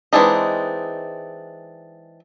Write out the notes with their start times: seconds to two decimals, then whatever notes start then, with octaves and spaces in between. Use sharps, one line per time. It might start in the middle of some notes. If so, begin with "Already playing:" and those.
0.13 E3 G#3 C4 D4 D#4